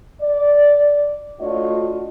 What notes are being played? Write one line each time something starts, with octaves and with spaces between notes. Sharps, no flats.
D5
A3 D4 F4 F#4 C#5 D#5